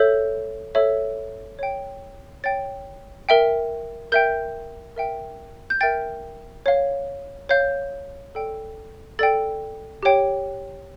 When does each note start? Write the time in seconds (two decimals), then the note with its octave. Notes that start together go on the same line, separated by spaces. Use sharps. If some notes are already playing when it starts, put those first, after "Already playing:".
Already playing: A4 C#5 E5 G6
0.75 A4 C#5 E5
1.59 C#5 G5
2.44 C#5 G5 A6
3.29 A#4 E5 G5
4.12 A#4 E5 G5 G6
4.96 A#4 E5 G5
5.70 G6
5.81 A#4 E5 G5 A6
6.66 C#5 F5
7.49 C#5 F5 G6
8.35 A4 D5 G5
9.19 A4 D5 G5 A6
10.03 G4 C#5 G5